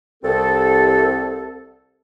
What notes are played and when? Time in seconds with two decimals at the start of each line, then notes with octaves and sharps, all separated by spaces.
0.23 C2 C4 A4